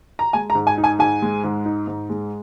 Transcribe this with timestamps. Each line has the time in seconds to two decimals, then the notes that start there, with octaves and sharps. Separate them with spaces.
0.19 A#5
0.33 G#3 G#5
0.50 A#5
0.55 G#2
0.67 G#5
0.78 D#4
0.84 G#5
0.99 G#2 G#5
1.22 G#3
1.44 G#2
1.65 D#4
1.87 G#2
2.09 G#3